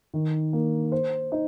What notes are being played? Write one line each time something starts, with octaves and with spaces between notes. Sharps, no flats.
D#3
A#3
C5
D#4